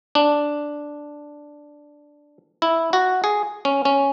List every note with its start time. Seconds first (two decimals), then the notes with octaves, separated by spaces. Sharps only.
0.15 D4
2.62 E4
2.93 F#4
3.24 G#4
3.65 C#4
3.85 C#4